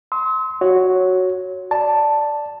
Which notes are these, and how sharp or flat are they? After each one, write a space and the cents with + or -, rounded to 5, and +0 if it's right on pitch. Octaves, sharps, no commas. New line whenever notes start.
C6 +0 E6 -45
F#4 +0 C#5 +0
D5 +0 A5 +0